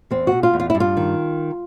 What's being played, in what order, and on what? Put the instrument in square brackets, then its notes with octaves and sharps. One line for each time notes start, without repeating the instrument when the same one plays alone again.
[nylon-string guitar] E2 C4
B2 F#4
F4
E2
F4
G2 E4
F4
D#3